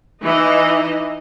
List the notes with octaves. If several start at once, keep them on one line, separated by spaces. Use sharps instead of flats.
E3 D#4 D#5